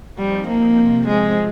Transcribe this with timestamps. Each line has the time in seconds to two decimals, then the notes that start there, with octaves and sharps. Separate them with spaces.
0.17 F3 G3 C4 D#4
0.47 A#3
0.78 C3 F3 C4
1.07 G#3